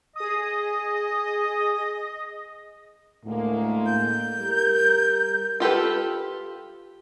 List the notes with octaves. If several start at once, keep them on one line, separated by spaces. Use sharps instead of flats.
G#4 D#5 D#6
D2 A2 G#3 A#3
G6
G3 A#4
F4 G4 A4 B4